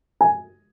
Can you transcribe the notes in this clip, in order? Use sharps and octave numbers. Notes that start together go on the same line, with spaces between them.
G#5